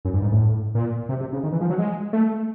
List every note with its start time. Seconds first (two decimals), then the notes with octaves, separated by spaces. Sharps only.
0.05 F#2
0.14 G2
0.22 G#2
0.31 A2
0.75 A#2
1.09 C3
1.21 C3
1.33 C#3
1.43 D#3
1.52 E3
1.61 F3
1.70 F#3
1.79 G#3
2.13 A3